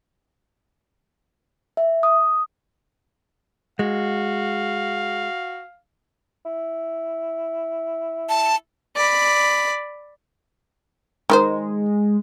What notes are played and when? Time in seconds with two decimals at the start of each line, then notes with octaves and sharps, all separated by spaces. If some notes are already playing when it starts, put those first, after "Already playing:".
1.77 E5
2.03 D#6
3.79 G#3 F#4 F5
6.46 E4
8.29 A5
8.96 D5 B5
11.30 D#3 G#3 E4 C5